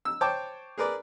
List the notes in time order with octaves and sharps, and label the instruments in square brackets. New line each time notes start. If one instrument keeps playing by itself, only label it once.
[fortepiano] E6
C5 C#5 G5 A5 D6
G#4 A#4 B4 D5